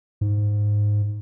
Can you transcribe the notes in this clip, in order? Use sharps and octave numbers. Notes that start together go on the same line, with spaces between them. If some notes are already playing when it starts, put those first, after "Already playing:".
G#2